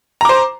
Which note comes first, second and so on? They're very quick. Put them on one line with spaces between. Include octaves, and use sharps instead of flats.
A#5 D6 C5